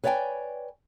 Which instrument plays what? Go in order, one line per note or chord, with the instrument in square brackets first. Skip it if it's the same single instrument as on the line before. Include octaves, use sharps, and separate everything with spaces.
[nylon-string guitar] B4 C#5 D5 E5 G5 G#5